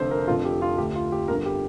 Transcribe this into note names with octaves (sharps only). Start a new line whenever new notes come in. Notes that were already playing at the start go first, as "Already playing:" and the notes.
Already playing: F1 F2 D3 C5
A#4
F1 F2 D3 F4
G4
F4
D2 D3 G4
F4
G4
G1 G2 D3 A#4
G4